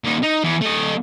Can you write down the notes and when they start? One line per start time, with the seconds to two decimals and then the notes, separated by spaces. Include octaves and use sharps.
0.04 A#2 D#4
0.23 D#4
0.44 E2
0.62 A3 D#5